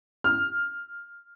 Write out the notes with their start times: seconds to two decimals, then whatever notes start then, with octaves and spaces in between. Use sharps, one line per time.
0.24 F6